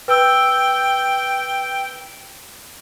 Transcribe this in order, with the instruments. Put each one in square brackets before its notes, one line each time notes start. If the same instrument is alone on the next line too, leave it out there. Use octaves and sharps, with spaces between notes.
[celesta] B4 E6 [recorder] G5